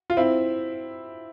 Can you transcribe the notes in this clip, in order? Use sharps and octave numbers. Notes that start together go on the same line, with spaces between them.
F4
C4 E4